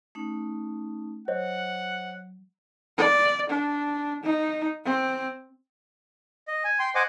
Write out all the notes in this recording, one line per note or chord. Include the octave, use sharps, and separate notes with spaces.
A3 C#4 D#4
F#3 C5 C#5 D#5 F#5
D5
D4
D#4
C4
D#5
G#5
G5 C6
C5 D#5 F#5 G#5 D6